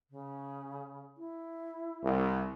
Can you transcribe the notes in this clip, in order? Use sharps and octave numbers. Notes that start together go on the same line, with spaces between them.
C#3
E4
C2